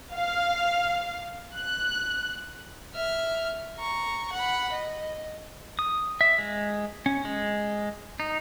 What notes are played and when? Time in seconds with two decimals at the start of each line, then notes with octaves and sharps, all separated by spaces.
0.14 F5
1.56 F#6
2.94 E5 F6
3.78 A#5 C#6
4.33 F#5 B5
4.73 D#5
5.79 D#6
6.21 E5
6.38 G#3
7.06 C#4
7.25 G#3
8.20 D#4